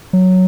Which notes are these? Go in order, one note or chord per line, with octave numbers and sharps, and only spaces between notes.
F#3